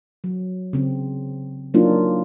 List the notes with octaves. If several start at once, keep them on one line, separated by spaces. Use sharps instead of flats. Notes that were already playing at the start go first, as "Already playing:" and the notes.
F#3
C#3 C4
F#3 A#3 D4 D#4 F4